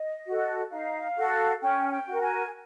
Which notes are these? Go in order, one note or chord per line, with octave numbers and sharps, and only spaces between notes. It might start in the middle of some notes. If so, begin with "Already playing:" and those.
Already playing: D#5
F#4 A4
D#4 F5
F#4 A4
C#4 G5
G#5
G5
F#4
A#4
G#5